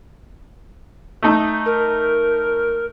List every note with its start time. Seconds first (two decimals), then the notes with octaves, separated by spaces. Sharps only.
1.23 A3 D#4
1.66 A#4